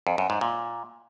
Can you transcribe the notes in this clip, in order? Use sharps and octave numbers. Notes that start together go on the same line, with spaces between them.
F2
F#2
G#2
A#2